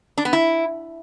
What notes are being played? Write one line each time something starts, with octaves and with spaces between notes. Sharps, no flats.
D4
B3
E4